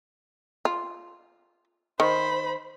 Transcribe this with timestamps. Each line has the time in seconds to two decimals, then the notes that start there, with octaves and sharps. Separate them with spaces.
0.65 F4
2.00 D#3 C5 B5